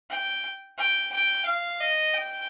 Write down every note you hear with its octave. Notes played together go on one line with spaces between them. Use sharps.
G5
G5
G5
F5
D#5
G5